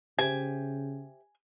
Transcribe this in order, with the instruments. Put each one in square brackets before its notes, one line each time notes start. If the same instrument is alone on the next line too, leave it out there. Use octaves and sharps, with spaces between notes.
[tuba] C#3 [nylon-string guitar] G4 C5 E5 [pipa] G#5